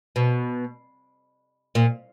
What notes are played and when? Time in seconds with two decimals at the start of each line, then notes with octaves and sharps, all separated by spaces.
0.16 B2
1.75 A#2